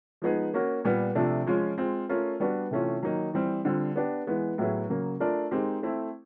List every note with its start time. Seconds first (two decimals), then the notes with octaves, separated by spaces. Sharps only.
0.22 F3 G#3 B3 D#4 G#4
0.54 A#3 C#4 F#4 A#4
0.84 A#2 G3 B3
1.15 C3 F3 A3 D4
1.46 F3 G#3 C#4 F4
1.78 G#3 C4 F4
2.09 A3 C#4 F4 A#4
2.40 G3 B3 D4 F#4
2.71 C3 E3 A3 C#4 F4
3.02 D#3 F#3 A#3 D#4
3.33 E3 G3 C4
3.65 D3 G3 C4 F4
3.96 B3 D4 G4
4.27 E3 G#3 B3
4.58 A2 F#3 B3 E4 G#4
4.89 C#3 F#3 A#3
5.20 A3 D4 F4 A#4 D5
5.51 G#3 C4 D#4 G4 A#4
5.83 A3 C4 E4